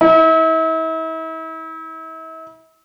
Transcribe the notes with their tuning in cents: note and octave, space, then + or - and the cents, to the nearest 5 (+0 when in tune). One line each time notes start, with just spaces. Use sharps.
E4 -40